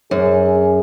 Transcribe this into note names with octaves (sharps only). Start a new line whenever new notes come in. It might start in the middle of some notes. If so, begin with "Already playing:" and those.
F#2 G#4